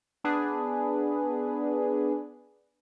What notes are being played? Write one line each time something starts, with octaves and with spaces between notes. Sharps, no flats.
B3 D4 G#4 B4